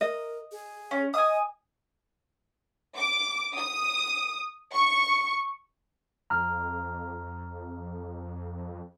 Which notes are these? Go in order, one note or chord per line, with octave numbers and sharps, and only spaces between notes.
A#4 D#5
G#4
C#4
D#5 G#5 D#6
D6
D#6
C#6
F2 A#5 F6